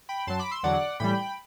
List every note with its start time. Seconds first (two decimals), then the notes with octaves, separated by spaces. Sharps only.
0.09 G5 B5
0.27 F#2 F#3 A5 C6
0.39 B5 D6
0.51 C6 E6
0.63 E2 D3 F#3 D5 F#5
1.00 A2 E3 G3 G5 B5